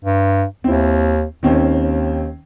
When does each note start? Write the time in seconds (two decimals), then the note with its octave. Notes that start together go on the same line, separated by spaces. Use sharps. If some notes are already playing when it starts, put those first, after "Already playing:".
0.05 G2
0.64 D#2 C4 E4
1.43 D#2 D#3 C4 C#4